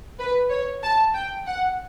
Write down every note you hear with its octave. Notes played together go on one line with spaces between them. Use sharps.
B4
C#5
A5
G5
F#5